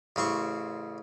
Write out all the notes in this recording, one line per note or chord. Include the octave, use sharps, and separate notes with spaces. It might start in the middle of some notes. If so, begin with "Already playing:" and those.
A1 C#3 C4 C#6